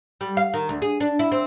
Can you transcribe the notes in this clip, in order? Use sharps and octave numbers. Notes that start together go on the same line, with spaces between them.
G3
F5
D#3
D2
G#4
D4
E4
C4